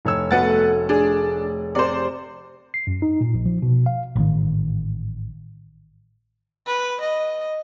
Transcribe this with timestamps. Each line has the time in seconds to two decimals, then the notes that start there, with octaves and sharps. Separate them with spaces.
0.05 F1 C#5 E6
0.31 A3 B3 F#4 F#5 A6
0.89 D4 G#4
1.75 C3 C5 D5
2.74 C7
2.87 F#2
3.02 D#4
3.21 A#2
3.34 A#1
3.46 F3
3.62 B2
3.86 F5
4.16 A1 G#2 B2 D#3
6.66 B4
7.01 D#5